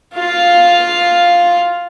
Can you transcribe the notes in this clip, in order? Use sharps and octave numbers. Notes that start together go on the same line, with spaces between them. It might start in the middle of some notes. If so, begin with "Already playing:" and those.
F4 F5